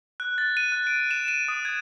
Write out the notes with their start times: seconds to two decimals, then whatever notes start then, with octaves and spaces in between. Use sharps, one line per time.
0.20 F#6
0.38 A6
0.57 D#7
0.72 F#6
0.87 D7
1.11 E7
1.28 D#7
1.48 D#6
1.65 G#6